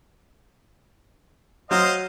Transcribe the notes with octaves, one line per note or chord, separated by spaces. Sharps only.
F#3 C5 D#5 F5